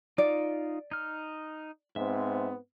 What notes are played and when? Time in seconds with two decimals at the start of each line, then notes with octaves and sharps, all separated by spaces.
0.18 D#4 F4 D5
0.91 D#4 F6
1.96 G#2 B3 C4 E5